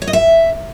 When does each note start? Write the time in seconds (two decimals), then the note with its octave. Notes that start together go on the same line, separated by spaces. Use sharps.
0.02 C#5
0.07 D#5
0.13 E5